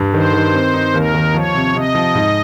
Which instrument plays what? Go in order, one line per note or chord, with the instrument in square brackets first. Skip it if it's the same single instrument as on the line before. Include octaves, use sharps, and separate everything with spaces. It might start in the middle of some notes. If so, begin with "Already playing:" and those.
Already playing: [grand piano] G2
[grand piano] D#3 [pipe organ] C5
[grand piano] D#3
C4
D#4
[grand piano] D#2 [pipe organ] A#4
[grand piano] D#3
[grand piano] F3 [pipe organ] C#5
[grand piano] C3
[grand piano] C3 [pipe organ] D#5
[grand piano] F3
G#2